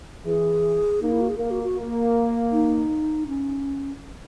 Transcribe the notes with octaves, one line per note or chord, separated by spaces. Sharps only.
E3 G#4
A#3 D#4
E4
F#4
G#4
A#3 A#4
F#4
F#4
A#3
D#4
C#4